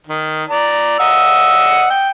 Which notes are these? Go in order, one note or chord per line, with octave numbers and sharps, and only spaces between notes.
D#3
D5 A#5
D#5 F#5 E6
G5